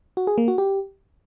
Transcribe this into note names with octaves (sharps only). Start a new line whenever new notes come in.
F#4
G#4
A#3
F#4
G4